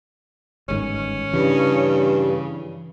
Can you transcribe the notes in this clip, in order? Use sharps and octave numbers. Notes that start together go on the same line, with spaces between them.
G1 G#2 D#3 C#4
G2 C#3 E3